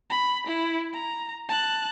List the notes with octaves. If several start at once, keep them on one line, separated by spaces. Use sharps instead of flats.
B5
E4
A#5
A5 F#6